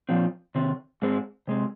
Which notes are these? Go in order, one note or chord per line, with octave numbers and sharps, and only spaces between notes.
A#2 F3 C4
C3 D#3 C4
G#2 G#3 C4
C3 G#3 C4